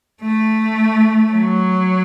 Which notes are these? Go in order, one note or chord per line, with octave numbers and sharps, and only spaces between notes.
A3
F#3